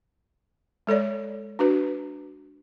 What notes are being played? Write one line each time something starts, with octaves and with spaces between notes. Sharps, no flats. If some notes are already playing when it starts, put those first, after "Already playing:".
G#3 A4 C#5 D5
D4 F#4 B4